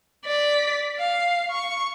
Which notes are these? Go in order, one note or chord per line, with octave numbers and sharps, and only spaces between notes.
D5 B6
F5
C#6